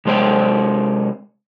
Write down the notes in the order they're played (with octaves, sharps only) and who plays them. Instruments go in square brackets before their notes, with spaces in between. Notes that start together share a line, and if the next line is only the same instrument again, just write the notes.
[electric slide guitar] C3 G#3 C5 C#5 G5